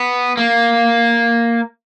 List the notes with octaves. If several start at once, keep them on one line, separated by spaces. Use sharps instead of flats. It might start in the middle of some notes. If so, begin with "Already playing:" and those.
Already playing: B3
A#3